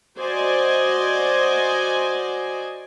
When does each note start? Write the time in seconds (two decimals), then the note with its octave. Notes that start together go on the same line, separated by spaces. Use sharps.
0.18 F#4 C5 D5 D#5 G#5